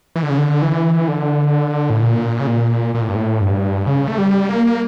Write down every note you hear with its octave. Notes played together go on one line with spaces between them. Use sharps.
E3
D3
C#3
D3
E3
D3
A2
A#2
C#3
A#2
A#2
A2
G2
A2
G2
C#3
A3
G3
A#3